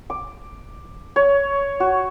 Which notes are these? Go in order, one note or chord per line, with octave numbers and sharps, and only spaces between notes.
D6
C#5
F#4